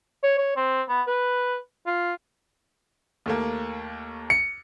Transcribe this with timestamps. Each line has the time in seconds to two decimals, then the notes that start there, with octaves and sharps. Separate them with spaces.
0.24 C#5
0.38 C#5
0.57 C4
0.89 B3
1.07 B4
1.87 F4
3.26 D#2 A3 A#3
4.30 C#7